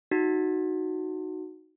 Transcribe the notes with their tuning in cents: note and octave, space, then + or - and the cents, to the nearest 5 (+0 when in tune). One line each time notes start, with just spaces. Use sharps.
D#4 +0 F#4 +0